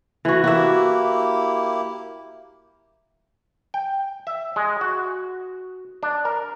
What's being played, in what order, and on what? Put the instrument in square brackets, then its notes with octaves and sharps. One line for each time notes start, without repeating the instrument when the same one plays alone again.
[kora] E3 F#4
[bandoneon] A#3 E4 G4 [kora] F#4 E5
[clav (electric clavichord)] G5
E5
G#3
F#4
D4
A#4